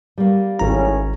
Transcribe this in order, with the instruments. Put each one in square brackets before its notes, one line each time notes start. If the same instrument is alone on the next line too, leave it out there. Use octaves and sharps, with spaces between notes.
[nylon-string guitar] G3 A#3
[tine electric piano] G#1 A#5 [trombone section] A2 D#3 C#4